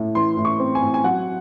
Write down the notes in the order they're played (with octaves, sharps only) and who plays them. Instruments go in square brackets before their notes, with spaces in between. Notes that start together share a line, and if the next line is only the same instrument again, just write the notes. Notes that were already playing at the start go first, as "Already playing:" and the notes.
Already playing: [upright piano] A2
E3 C6
A2
C#6
C4
G#5
A2
G#5
F#3 F#5